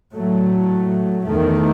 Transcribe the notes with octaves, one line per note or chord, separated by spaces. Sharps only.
A2 F#3 A3
E2 D#3 A3